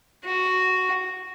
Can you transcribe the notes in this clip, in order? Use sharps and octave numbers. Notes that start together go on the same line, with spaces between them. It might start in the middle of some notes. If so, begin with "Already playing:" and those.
F#4